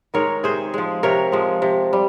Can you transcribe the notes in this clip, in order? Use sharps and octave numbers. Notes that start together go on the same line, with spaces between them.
D#3 G#3 A#4 C#5
C3 G#4 C5
F3 G#3
C3 A#4 C#5
F3 G#3
C3
G3